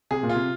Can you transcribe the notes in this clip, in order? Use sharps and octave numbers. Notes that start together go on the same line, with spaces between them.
C3 G#4
A#2
F4
C3